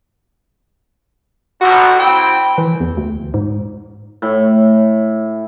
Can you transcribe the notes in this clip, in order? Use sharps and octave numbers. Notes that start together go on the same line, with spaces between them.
A1 F#4
C4 E4 G5
E3
E2
D2
G#2
A2